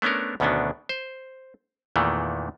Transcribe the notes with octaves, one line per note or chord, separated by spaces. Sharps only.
A3 B3 C#4 D4 A#4
D2 B2 D#3 B3 C#4 D4
C5
E2 A#2 D#3 E3 A3